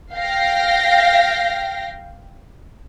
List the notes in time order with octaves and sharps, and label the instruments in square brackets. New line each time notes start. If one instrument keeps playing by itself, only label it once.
[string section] F5 G5 A#6